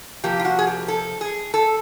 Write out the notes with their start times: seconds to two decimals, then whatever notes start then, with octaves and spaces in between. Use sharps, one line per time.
0.24 C3 F3 A#3 G4
0.39 F4
0.45 F#4
0.59 G#4
0.67 G4
0.88 A4
1.21 G#4
1.54 A4